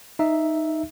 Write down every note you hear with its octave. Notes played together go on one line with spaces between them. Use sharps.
D#4 E5